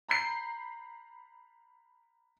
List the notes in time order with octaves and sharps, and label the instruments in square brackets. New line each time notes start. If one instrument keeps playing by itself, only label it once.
[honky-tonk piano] A#5 B5 G6 C7